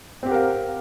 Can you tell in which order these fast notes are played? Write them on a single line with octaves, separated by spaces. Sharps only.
C4 G4 F#5 A#4 F5